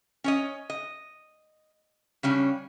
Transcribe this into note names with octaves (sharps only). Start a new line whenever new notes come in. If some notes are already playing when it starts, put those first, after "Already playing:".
C#4 C#5 D#5
D#5
C#3 G3 C#4 D4